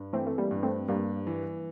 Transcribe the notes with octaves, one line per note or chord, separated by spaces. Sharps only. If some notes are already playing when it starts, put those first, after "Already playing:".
Already playing: G2
E3 A3 C4
A3
G3 A#3
G2
A3 C4
G2 G3 A#3
E3